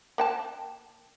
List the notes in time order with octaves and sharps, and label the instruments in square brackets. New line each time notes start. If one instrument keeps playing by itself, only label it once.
[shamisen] A#3 G5 A5